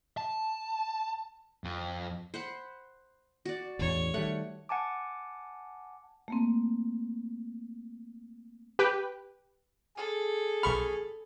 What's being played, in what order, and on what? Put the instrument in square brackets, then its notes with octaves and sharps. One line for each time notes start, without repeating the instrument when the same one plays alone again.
[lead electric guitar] A5
F2
[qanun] C5 F#5 B5
F#4 D5
[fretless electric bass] A1 E2 [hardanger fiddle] C#5
[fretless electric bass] D#3 G3 A3 [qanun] F#5
[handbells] F#5 G#5 A5 D6
[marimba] A3 A#3 C4
[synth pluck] G4 B4 G5
[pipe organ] G#4 [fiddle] A4
[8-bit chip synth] B1 C#6 F6 [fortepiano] B5